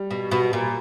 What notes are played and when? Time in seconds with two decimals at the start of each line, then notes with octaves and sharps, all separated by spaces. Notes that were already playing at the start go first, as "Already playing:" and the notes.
Already playing: G3
0.11 B2
0.31 B2
0.53 A#2